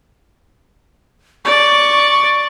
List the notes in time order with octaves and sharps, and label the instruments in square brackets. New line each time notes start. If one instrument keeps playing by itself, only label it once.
[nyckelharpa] D5 [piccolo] C#6